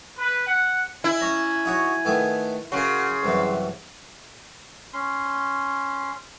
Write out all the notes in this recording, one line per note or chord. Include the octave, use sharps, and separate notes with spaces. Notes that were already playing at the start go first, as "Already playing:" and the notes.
B4
F#5
E4 G#5
C#4 A#5
D#4 F#4 C#5
D#3 A3 B3
C#3 F#4 A#4 C6
C2 F#2 E3
C#4 C6